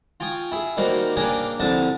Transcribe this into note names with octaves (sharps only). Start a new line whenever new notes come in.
F4 G5 G#5 C#6 D#6
E4 G#4
D#3 G3 A#3 F#4 C5
C#3 A#3 D4 G5 G#5 D#6
C2 D3 F3 A5 D#6